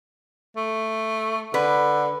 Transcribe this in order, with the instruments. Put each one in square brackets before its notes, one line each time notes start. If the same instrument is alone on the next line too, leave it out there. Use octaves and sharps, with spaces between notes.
[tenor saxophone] A3
[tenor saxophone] D3 [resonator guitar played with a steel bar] B4